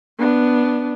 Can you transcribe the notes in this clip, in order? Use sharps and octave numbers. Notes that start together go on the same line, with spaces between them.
B3 D4